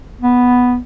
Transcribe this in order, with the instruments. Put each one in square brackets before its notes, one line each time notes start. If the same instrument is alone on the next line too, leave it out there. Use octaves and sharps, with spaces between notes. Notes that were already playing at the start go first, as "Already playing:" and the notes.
[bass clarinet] B3